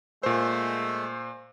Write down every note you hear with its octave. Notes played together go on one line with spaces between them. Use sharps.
A#2 G#3 A3 C5